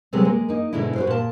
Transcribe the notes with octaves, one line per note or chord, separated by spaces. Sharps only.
C3 F#3 G#3 A3 B3 C4
G#3 A#3
A#3 D#4
G#2 B2 D3 D4 E4
F#4 B4 C5
A#2 A5